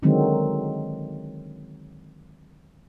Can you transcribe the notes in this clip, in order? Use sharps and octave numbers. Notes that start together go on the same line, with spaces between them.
D3 D#3 F#3 G#3 C4